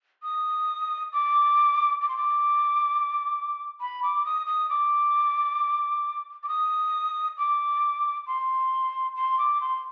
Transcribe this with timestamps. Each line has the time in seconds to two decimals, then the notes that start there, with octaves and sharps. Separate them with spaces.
0.23 D#6
1.13 D6
2.02 D6
2.09 C6
2.16 D6
3.80 B5
4.03 D6
4.25 D#6
4.47 D#6
4.69 D6
6.43 D6
6.48 D#6
7.37 D6
8.27 C6
9.16 C6
9.38 D6
9.61 C6